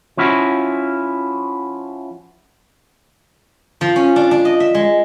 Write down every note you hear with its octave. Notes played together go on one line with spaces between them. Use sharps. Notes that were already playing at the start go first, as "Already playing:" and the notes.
F3 C#4 E4 F#4
F3
C#4
D4
D4
D#5
E5
G#3